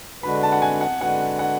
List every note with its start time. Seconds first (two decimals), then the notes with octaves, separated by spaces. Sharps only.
0.23 D3 G#3 D4 F#4 B4 B5
0.43 A5
0.52 F#5
0.62 G#5
0.81 F#5
1.01 D3 G#3 D4 F#4 B4 F#5
1.39 F#5